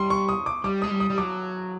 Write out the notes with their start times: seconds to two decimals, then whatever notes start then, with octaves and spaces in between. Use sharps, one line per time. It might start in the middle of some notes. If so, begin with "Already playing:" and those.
Already playing: G3 C6
0.10 C#6
0.29 D#6
0.46 D6
0.64 G3 D6
0.82 G#3 D#6
0.91 G3
1.00 D#6
1.10 G3
1.18 F#3 D6